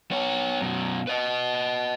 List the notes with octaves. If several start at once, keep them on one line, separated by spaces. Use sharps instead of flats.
B3 C#5
F#2 B2
B4 D#5